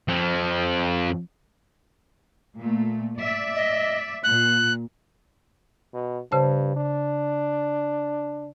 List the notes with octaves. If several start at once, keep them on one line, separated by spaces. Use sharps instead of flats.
F2 F3
A#2 A3
D5 E5
D#5
A#2 F#6
B2
G2 C#3 C5 A5
D4